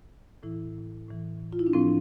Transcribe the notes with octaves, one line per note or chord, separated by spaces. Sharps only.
A2 E3 E4
A2 E3
F4
E4
D4
A2 F3 C4